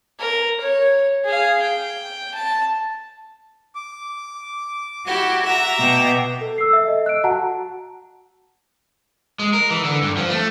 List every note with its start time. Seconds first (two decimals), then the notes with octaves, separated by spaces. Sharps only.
0.19 A#4
0.60 C#5
1.24 G#4 F5
1.62 G5
2.34 A5
3.75 D6
5.07 E4 F#4 G4
5.45 E5 A#5
5.80 B2 G5
6.41 A4
6.58 E6 C7
6.73 E5
6.88 D#5
7.06 E6 F#6 D7
7.24 F#4 F#5 A5 A#5
9.39 G#3
9.53 A#4
9.70 E3
9.84 D3
10.03 G2
10.17 F3
10.30 A3